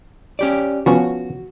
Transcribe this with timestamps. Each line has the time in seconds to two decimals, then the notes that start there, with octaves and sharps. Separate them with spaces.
0.39 C#4 G4 D5
0.86 F3 B3 C#4 F#4